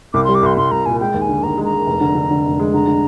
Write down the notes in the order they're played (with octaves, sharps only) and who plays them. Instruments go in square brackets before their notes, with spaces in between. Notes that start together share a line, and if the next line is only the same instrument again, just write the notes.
[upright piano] C2 [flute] D6
[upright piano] G3 [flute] C6
[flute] D6
[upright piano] C2 [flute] C6
[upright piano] C2 [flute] C6
[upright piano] C2 [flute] A#5
[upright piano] A#2 [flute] G#5
[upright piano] G#3 [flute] G5
[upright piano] D#2
[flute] G#5
[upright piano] D3
[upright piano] D#2 [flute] A#5
[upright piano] G#3
[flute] A#5
[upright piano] G#3
F1
D3
D3
D3
F1
G#3
[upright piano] D3 [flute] A#5
[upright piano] D3